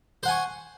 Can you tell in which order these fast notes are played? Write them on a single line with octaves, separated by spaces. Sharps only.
C5 F#5 G#5 C#6